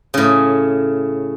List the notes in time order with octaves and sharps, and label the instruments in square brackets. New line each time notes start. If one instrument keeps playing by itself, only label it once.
[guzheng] A2 C#3